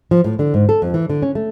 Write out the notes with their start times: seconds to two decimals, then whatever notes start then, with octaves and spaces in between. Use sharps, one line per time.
0.11 F3
0.24 A2
0.39 D3
0.54 G#2
0.69 A4
0.82 F2
0.94 E3
1.10 D3
1.22 C#4
1.35 A3